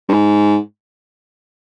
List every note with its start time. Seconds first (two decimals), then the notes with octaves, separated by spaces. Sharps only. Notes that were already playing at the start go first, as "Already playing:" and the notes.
0.09 G2
0.13 G#2